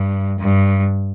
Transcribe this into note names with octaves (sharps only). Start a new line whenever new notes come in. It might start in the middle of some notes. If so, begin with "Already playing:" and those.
Already playing: G2
G2